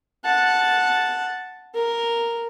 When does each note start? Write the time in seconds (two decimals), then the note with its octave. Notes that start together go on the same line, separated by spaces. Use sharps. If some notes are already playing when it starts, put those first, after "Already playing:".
0.25 F#5 A5
1.75 A#4